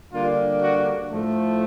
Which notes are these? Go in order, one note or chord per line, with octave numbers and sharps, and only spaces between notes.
D3 G3 A#3 D4 F4
F#4
A2 F3 A3